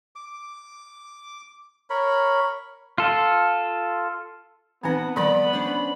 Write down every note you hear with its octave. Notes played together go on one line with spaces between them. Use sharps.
D6
A#4 C#5 B5
F4 A4
E3 B3 C4 D#4 B4 F#5 A5
D#3 F3 G3 A4 D5 B5
C#4 D4 C5